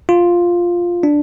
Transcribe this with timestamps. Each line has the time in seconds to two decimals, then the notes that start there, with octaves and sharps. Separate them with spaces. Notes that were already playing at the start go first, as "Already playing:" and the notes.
0.09 F4
1.03 D4